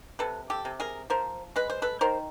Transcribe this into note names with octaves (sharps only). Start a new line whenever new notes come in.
C3 A4 B4
G4 A4
C3
G#4 A#4
F3 A#4 C5
G#3 B4
C5
A4 B4
D#3 A#4 C5